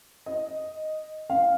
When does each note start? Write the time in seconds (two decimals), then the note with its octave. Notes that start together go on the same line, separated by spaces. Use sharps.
0.26 D#5
1.30 F5